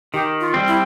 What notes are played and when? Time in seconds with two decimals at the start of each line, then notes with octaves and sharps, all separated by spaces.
0.13 D#3 G4
0.40 F4
0.54 G3 C4
0.68 E4